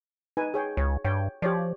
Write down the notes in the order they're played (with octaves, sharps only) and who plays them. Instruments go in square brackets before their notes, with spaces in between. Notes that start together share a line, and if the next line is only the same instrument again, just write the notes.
[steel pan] D#4 B4 G#5
G#4 C#5 G5
[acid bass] C#2 [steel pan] C#5
[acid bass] G2 [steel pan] C#5 G5
[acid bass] F3 [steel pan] G4 C#5 D5